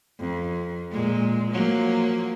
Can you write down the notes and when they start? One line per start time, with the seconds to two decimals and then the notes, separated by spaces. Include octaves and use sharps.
0.19 F2
0.91 A#2 G#3
1.51 F3 F#3 A#3